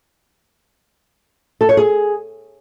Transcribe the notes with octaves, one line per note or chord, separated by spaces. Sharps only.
A4
C#5
G#4